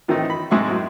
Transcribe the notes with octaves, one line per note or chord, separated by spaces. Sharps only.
A2 D#3 E3 A3 C4 D#4
B5
G#2 C3 G#3 E5 C#6
F#2 A2